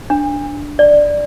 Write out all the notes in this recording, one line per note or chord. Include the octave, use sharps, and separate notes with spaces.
D4
D5